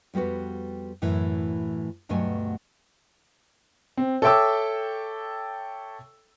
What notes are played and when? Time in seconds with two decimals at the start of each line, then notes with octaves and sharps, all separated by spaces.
0.14 F2 G3 B3 F#4 B4
1.02 F#2 A2 E3
2.09 D2 G2 B2 F#3 A3 G#5
3.97 C4
4.22 A4 C#5 E5 G5 D6 E6